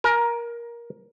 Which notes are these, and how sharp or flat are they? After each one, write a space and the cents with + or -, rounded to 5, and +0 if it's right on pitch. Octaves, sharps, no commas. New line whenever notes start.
A#4 +15 G#5 +35